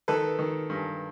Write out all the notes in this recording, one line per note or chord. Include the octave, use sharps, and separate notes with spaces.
D#3 A4 B4
D#3
G2